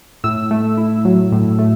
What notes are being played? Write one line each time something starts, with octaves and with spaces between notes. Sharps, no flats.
A2 E6
A3
E4
F#3
A2
A3